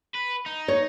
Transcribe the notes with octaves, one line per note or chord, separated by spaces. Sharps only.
B4
D#4
C#5